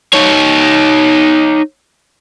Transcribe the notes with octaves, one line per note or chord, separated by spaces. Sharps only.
D#4 C#5